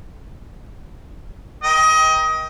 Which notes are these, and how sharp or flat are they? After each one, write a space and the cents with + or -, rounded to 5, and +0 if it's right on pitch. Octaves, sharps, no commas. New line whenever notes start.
A#4 +30 D#5 +25 G5 +0